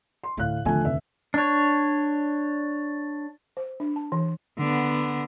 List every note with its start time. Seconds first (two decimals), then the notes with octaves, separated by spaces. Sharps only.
0.24 C6
0.37 D2 A2 F5 F#6
0.65 D#2 D3 F3 A3 G#5
0.84 F1 E5
1.34 D4 C#5
3.57 C5
3.80 D4
3.96 A5
4.12 E3
4.59 D3 B3